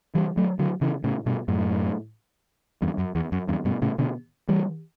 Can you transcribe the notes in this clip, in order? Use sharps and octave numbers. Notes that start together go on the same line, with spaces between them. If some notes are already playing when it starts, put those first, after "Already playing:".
E3 G3
F#3 A3
D3 F#3
C#3 E3
A2 C#3
G2 B2
F#2 A2
E2 G2
F#2
E2
F#2
E2 G2
G2 B2
A2 C#3
B2 D3
E3 G3